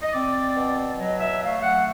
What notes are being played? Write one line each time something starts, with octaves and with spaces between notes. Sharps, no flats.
D#5
C4 D5
B2
F#3 D#5
E5
A3 F5
F#5